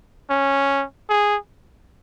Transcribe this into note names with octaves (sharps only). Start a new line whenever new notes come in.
C#4
G#4